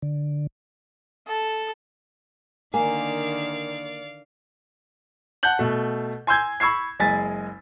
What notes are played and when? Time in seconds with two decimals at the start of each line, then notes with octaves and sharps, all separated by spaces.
0.02 D3
1.28 A4
2.74 D3 D#3 A#3 D5 F5 G#5
5.43 F#5 A5 F#6 G6 F#7
5.59 B2 A3
6.27 G#5 C6 E6 G6 G#6
6.60 B5 C#6 E6 G#6 C7
6.99 F#1 G#3 G#5 A6 B6